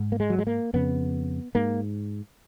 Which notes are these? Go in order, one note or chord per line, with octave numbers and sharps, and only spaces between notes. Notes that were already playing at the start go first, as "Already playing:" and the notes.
Already playing: G#2
A#3
G#3
F#3
G#3
A#3
F2 C#3 B3
G#2 A#3